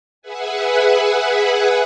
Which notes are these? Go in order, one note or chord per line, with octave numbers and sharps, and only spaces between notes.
G#4 B4 E5 F#5 G#5